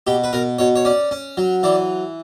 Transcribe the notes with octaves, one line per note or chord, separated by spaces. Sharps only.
B2 G4
B4
B2 A#4
B2 C#5
C#5
C#4 D5
C#4
F#3
E3 D5